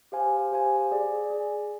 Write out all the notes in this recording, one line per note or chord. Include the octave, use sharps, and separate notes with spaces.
G4 C5 F5 G#5
G4 C5 F5 G#5
G#4 D5 G#5
G#4 D5 G#5